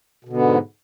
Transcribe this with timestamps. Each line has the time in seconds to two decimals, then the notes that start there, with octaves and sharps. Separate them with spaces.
0.24 B2
0.29 D3
0.33 B3
0.37 G#2